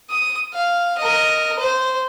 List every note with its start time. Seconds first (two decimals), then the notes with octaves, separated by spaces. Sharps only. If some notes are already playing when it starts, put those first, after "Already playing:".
0.10 D#6
0.54 F5
0.98 A#4 D#5
1.59 C5